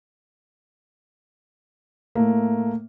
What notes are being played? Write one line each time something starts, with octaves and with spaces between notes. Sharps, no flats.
A2 A3 A#3